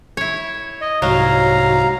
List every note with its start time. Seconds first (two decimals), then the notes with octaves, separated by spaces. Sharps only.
0.17 E4 C#5
0.81 D#5
1.02 C2 G#2 F#3 F#4 F5 A#5